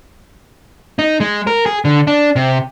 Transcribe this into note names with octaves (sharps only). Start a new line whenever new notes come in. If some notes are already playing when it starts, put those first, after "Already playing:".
D#4
G#3
A#4
G#4
D3
D4
C3